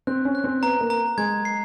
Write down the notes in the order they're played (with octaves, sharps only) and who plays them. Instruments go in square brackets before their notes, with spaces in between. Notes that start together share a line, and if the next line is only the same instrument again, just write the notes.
[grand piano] C4 [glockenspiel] F#6
[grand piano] C#4
[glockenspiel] F#6
[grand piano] C4
[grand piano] B3 [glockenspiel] A#5
[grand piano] A#3
[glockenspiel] A#5
[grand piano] G#3 [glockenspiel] G#6
[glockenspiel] C7